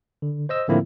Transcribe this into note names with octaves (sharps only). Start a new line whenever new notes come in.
D3
C5 D#5 E6
A2 D3 F3 A#3 C4 E4